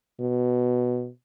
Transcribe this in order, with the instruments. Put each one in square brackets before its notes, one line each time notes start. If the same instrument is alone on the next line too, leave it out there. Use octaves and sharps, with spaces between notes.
[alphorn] B2